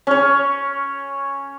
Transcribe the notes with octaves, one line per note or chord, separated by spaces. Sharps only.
C#4 C#5